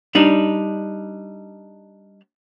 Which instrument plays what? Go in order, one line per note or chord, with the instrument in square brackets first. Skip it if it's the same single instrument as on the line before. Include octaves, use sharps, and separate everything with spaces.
[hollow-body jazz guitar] G3 D4 D#4